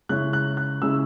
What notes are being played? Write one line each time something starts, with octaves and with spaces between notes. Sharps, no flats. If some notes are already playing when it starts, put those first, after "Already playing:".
C#3 G#3 C#4 E4 F#6
F#6
F#6
C#3 G#3 C#4 E4 E6